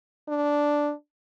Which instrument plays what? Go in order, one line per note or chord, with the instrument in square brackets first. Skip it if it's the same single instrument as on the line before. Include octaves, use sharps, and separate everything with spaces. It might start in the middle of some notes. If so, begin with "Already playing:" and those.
[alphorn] D4